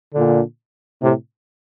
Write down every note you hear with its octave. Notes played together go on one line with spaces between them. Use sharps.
A#2 D3
A2 C3